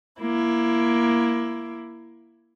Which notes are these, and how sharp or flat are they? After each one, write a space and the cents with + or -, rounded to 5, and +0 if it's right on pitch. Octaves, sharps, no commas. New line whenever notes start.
A#3 +15 E4 +20